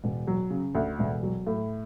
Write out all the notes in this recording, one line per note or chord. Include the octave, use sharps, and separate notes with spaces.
E1
F#3
C#3
D2
E1
F#3
A2